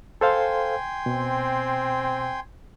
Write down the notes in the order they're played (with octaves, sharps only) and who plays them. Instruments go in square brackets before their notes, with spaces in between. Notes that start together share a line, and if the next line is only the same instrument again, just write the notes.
[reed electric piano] A4 C5 F5 [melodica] G5 G#5 C6
[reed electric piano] B2 [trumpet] C4